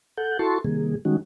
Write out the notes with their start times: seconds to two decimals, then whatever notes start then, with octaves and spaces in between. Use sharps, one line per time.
0.18 A4 F#5 G6
0.39 E4 F#4 A4 A5 C6 C#6
0.64 C3 D#3 G3 A#3 G#4
1.05 D#3 G3 G#3 C#4 D#4 F#4